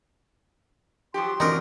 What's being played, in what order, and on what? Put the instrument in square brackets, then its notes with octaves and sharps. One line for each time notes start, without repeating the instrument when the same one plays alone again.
[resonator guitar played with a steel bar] F3 F#3 G4 [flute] C6
[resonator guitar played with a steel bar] F#2 D3 F#3 [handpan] E3 C4 D5 [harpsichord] D#4 A#4